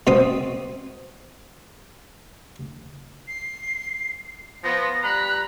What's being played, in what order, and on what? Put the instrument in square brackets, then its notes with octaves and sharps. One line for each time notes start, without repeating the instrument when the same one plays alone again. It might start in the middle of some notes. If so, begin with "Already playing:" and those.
[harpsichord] B2 C4 D#6
[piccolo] C7
[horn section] F3 B3 [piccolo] A#6
[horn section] G3 A#5 B5 [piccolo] F#6